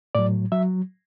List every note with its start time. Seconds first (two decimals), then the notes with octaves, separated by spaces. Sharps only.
0.15 A2 F#3 D5
0.52 F#3 E5